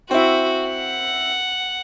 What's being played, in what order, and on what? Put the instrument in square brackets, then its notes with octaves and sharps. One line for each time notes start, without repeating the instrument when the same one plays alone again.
[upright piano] C4 E4 [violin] F#4
[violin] F#5